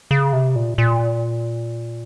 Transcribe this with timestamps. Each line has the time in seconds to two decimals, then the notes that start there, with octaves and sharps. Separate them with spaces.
0.11 C#3
0.33 C3
0.56 A#2
0.78 A#2